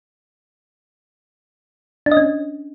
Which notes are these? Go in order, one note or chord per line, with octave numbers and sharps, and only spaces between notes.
D4
D#5
C#4